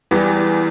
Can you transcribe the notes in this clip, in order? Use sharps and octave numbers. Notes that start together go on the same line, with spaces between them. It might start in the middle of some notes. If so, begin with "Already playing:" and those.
E2 E3 G3